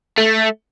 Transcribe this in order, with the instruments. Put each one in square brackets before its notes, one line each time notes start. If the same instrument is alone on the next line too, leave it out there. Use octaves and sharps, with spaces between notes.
[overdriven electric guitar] A3